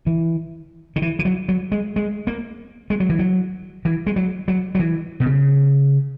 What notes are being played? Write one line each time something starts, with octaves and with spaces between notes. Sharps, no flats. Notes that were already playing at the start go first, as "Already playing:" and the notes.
E3
D#3
E3
E3
F#3
F#3
G#3
G#3
A#3
G#3
F#3
E3
F#3
E3
G#3
F#3
F#3
F#3
E3
B2
C#3